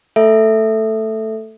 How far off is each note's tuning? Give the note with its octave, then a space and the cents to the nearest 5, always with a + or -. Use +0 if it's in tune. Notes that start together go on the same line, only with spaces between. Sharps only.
A3 +10 A4 +0 E5 +0